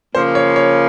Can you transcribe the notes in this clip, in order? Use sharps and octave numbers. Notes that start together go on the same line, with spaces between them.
C#3 F3 A#3 C5
C#5
C#5